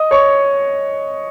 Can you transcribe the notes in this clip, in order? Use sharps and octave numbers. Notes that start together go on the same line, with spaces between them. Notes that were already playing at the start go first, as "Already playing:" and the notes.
Already playing: D#5 D#6
C#5 C#6